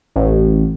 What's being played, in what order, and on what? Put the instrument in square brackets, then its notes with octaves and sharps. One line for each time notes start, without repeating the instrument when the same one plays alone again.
[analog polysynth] A1